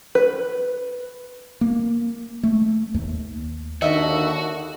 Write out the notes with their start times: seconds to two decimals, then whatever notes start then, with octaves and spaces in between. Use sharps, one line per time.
0.15 B4
1.61 A#3
2.43 A3
2.94 D#2
3.82 D#2 D3 D#3 F#4 D#5 E5